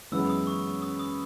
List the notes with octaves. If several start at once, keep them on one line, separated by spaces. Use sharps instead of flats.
F#2 E3 G#3 B3 E6
D#6
C#6
D#6
D#6